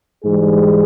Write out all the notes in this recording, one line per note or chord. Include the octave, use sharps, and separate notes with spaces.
G#2 E3 G3 G#4